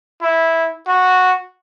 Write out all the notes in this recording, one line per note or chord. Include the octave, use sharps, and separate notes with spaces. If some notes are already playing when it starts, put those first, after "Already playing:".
E4
F#4